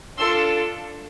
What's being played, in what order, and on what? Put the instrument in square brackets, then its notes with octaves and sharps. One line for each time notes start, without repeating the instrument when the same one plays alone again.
[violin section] D4 F4 A4 C6 E6